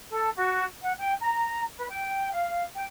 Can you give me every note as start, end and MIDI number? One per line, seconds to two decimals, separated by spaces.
0.11 0.30 69
0.35 0.63 66
0.81 0.91 78
0.98 1.13 79
1.20 1.63 82
1.76 1.85 71
1.89 2.32 79
2.33 2.62 77
2.75 2.84 79